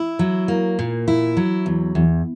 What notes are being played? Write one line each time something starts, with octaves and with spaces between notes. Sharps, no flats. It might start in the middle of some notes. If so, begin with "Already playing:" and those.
Already playing: E4
F#3
A#3
A#2
E4
F#3
E2
E2